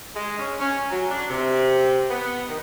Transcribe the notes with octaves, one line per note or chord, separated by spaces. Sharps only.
G#3
C#4
C#4
F#3
D4
C3
B3
D#3